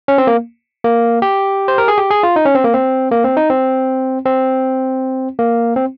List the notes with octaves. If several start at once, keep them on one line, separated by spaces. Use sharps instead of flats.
C#4
C4
A#3
A#3
G4
C5
A#4
G#4
G4
G#4
F4
D#4
C#4
C4
A#3
C4
A#3
C4
D#4
C4
C4
A#3
C4